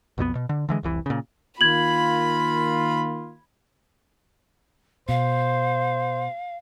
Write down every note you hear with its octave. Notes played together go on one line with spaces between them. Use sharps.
B1 F2 D#3 B3
B2
D3
D3 E3 G#3
F1 C2 E3
A#2 C#3
D#3 A#3 F4 B5 G#6 F#7
B2 C5 F5